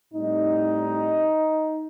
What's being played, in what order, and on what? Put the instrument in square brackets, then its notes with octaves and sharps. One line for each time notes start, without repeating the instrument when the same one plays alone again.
[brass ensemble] A2 G3 C4 D#4